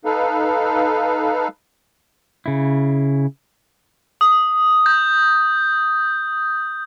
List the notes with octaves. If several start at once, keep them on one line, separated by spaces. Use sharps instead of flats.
D#4 A4 B4 F5
C#3 E4
D#6
G6